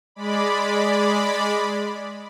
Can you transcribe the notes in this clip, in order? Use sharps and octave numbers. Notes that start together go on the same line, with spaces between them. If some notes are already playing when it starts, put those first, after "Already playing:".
G#3 D5 B5